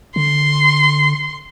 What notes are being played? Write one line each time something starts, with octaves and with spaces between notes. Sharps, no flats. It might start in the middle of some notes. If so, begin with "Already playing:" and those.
D3 C6